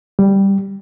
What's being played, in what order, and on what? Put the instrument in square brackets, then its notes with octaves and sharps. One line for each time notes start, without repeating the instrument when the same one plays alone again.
[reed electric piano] G3